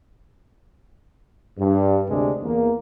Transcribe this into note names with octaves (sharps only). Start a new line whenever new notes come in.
G2
D2 C3 G#3 D4
E2 A#3